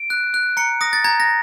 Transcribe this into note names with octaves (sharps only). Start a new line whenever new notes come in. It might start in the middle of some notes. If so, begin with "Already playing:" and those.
Already playing: D7
F#6
F#6
A#5 C#7
D#6 A#6
A6
A#5 G#6
A#6